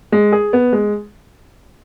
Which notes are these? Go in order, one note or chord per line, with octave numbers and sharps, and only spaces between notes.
G#3
G#4
B3
G#3